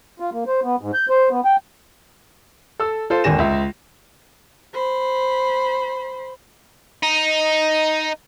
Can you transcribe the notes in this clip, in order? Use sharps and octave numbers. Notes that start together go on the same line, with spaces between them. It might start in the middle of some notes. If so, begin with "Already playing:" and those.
F4
A#3
C5
B3
G#2
G6
C5
B3
G5
A4 E6
F4 A4 C5
G#1 D#2 D3 G#5 A#6 E7
C#2 E5
C5 B5
D#4